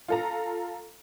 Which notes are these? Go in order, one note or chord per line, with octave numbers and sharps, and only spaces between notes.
F4 A4 A#5